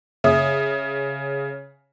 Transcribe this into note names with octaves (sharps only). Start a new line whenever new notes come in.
C#3 E5 D#6